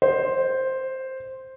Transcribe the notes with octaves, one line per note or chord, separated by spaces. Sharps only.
C5